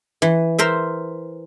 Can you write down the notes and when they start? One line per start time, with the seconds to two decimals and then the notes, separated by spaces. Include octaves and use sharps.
0.22 E3
0.58 A#4 C5 E5